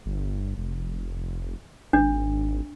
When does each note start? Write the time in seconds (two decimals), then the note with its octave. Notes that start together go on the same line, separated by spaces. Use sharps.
0.06 G1
0.57 F1
1.93 G#1 D4